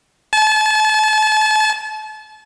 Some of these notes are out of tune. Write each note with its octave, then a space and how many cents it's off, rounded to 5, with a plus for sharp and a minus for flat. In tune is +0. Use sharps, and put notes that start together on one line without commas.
A5 -35